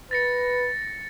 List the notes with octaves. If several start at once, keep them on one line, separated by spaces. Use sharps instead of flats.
B4 A6 A#6 C#7